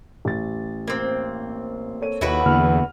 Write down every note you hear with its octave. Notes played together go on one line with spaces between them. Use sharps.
A1 A6
A#3 C4
A4 C#5 D#7
D#2 E4 F#4 B4
E2 D3 A#3 F6